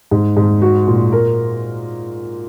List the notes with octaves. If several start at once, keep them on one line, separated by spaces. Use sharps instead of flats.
G#2
G#2
F#4
A#2
A#4